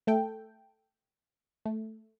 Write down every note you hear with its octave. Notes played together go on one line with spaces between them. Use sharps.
A3 A4 G5
A3